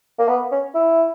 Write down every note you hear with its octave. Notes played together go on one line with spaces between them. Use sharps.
A#3
B3
C#4
E4